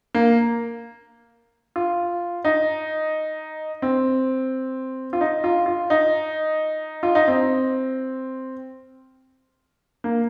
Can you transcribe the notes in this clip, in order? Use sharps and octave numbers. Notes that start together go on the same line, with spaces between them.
A#3
F4
D#4
C4
F4
D#4
F4
F4
D#4
F4
D#4
C4
A#3